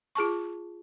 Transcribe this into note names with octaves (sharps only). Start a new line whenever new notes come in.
F4 G#4 A5 C#6